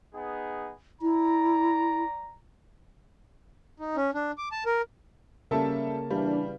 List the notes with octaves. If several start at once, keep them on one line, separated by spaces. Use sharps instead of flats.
B3 D#4 G#4
E4 D5 A#5
D#4
C#4
D4
D6
A5
A#4
C#3 G3 A#3 C#4 A4 E5 A5
E3 G3 D4 E4 B4 F5